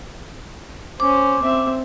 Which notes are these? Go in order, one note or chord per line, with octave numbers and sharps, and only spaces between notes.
C#4 C5 D6
C4 E5